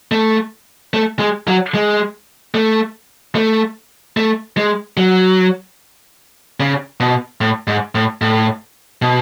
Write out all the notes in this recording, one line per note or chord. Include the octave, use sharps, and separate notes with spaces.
A3
A3
G#3
F#3
G#3
A3
A3
A3
G#3
F#3
C#3
B2
A2
G#2
A2
A2
B2